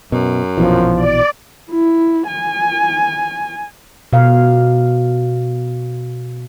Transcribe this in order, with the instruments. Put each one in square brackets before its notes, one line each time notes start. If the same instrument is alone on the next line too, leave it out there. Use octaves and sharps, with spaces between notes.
[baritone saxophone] F#2 [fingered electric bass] B2
[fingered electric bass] A#1 B2 E3 [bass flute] F3
[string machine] D5
[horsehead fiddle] E4
G#5
[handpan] B2 F5